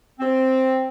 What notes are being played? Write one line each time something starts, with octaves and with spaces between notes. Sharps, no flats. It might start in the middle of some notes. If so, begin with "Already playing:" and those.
C4